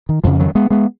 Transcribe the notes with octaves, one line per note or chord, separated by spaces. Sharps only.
D#3
F2 C#3 F3
D#3 F#3
G#3 B3
G#3 B3